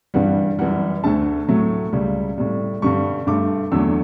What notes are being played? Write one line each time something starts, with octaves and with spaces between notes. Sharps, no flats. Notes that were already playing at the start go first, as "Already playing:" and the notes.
G2 E3 G3 F#5
F#2 E3 G3 F#5
D2 D3 A3 A5
A2 F#3 A3
C#2 C#3 G3
A2 G3
G2 D3 G3 C#6
G2 D3 A3 D6
E2 D3 F#3 A3 E6